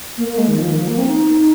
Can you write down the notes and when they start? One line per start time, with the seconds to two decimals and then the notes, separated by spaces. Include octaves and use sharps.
0.18 A#3
0.28 A#3
0.38 G#3
0.48 D#3
0.58 F3
0.68 D#3
0.78 F3
0.88 A#3
0.98 C4
1.07 D#4